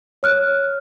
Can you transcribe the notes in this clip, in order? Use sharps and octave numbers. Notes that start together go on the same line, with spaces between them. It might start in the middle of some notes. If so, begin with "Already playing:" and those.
C#5 F6 F#6